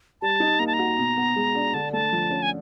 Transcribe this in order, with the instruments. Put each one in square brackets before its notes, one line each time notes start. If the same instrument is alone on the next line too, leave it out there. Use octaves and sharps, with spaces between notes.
[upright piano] G3 [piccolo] A5
[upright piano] D#4
[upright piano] A#3 [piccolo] A#5
[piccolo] A5
A#5
[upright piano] F#4
B2
B3
G#3
D4
[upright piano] D3 [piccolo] A5
[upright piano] A3 [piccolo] A5
[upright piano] F3
C#4
[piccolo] G#5